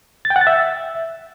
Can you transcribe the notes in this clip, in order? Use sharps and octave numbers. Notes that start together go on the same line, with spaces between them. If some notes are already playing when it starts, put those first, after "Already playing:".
A6
G5
F#5
A6
E5